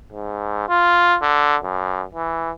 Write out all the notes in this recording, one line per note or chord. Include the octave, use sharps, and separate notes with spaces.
G#2
F4
D3
F#2
E3